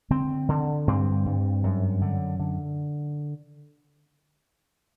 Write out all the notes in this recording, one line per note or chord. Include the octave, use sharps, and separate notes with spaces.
D3 C4
D3
G2 C4
G2
F#2
D3
D3